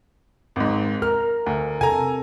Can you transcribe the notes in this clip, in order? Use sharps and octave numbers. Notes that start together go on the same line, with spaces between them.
G#1 G#2
A#4 F6
D2
C3 A4 G#5 A#5